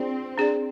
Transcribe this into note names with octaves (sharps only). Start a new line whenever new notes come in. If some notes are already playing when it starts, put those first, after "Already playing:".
Already playing: C4 D4 F4 G#4 D5
D4 G#4 D5